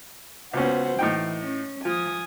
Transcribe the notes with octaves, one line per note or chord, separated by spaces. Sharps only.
C#2 B3 C#4 F#4 C5
A2 E3 D#4 G5
C#4
F3 G#5 D#6